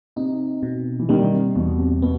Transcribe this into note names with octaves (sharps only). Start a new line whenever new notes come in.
C3 D#4
B2
E3
D#3 G3
C3
E2 B2
C3
B2 B3